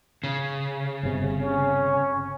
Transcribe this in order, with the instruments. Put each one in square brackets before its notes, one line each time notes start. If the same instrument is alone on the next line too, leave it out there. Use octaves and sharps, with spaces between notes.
[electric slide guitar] C#3
[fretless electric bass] G1 C3
[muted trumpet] C#4